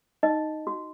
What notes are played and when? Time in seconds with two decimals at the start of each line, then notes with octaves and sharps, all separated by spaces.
0.23 D#4 D#5
0.67 F#4